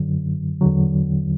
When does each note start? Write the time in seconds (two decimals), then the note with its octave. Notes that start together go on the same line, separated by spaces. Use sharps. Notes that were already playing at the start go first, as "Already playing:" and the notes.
Already playing: F#2 D3 F#3
0.61 E2 D3 F#3